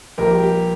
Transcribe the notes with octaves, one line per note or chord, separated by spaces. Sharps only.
A#1 G4 A#4
G4
G3
G4